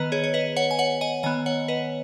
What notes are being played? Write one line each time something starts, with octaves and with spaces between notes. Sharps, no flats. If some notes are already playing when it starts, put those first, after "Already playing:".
Already playing: D#3 B3 B4 D#5
G#4 C#5
C#5
B4 D#5
C#5 F#5
G#5
C#5 F#5
D#5 G#5
D#3 B3 D#5 G#5
C#5 F#5
B4 D#5